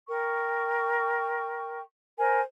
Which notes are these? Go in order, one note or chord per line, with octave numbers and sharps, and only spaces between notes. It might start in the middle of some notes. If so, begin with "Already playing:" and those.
A#4 G5 C#6
A#4 C5 G#5